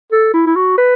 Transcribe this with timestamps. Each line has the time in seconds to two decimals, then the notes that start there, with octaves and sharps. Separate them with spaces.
0.12 A4
0.34 E4
0.47 E4
0.56 F#4
0.77 B4